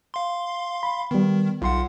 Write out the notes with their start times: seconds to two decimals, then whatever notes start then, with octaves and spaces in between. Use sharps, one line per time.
0.14 F5 C6
0.83 B5
1.11 D#3 G3 B3
1.62 B1 F4 F#5 C6